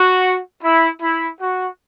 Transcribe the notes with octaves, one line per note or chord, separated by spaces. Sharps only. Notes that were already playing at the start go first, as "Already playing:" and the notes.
Already playing: F#4
E4
E4
F#4